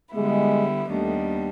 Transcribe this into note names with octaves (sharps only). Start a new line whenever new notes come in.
D3 G3 G#3 B3 E4
D#2 D#3 G3 A3 B3 D4